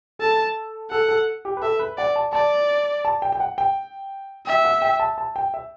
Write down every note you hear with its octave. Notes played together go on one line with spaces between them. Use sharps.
A4 A5
A4 F#5
A4
G4
B4
A4 E5
B4
D5 F#5
A5
D5 A5
A5
G5
G5
F#5
G5
E5 G5
F#5
G5
A5
A5
G5
E5